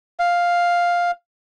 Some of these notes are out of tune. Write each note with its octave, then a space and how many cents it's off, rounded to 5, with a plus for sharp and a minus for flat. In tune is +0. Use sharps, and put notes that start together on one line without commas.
F5 +5